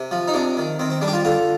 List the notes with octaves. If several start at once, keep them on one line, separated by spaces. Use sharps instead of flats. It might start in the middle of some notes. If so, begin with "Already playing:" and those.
Already playing: C3
F3
D#4
C3 D4
D#3
D#3 C4
C4
G3 D4
G4
F4
D3 F4